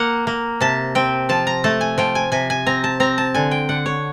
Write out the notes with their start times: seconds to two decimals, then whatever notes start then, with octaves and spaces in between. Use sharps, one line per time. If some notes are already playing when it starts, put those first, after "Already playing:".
Already playing: A#3 F#5
0.27 A#3
0.61 C3 A5
0.95 C4 G5
1.29 F3 A5
1.47 A#5
1.64 A3 A5
1.81 G#5
1.98 F3 G5
2.15 G#5
2.32 C3 G#5
2.50 G#5
2.66 C4 A#5
2.84 A5
3.00 C4 A#5
3.18 A5
3.34 D3 G#5
3.51 G5
3.69 D3 F#5
3.86 C#5